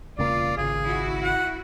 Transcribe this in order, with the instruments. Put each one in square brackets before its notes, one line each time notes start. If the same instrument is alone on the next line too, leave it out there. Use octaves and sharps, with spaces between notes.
[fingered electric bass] E1 C#3 A#3 [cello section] F4 [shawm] D5
[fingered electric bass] G#1 C#3 [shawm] G#4
[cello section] E4 F#4
[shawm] F#5